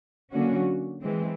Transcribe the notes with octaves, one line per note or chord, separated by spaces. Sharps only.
D3 F#3 A#3 C#4 F#4
E3 G#3 C4